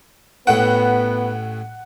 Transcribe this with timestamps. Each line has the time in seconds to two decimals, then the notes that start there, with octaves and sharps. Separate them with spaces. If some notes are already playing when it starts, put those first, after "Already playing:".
0.47 A1 A2 B3 F#5 G5